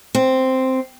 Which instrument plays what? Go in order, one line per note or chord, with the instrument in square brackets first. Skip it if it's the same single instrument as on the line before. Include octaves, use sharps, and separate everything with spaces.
[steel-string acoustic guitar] C4